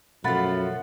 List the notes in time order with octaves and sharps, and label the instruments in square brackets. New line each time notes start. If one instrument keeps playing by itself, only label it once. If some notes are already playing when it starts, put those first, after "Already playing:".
[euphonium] F#2 [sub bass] B2 [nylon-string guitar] F3 A3 [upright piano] F#5 B5 A6